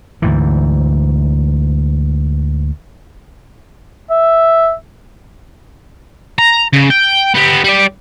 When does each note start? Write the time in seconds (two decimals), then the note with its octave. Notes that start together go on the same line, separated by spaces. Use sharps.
0.22 D2 G#2 E3
4.11 E5
6.38 A#5
6.73 C#3
6.90 G5
7.35 B3 G4
7.64 G3 D5